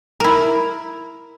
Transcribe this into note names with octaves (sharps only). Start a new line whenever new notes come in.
E4 A#4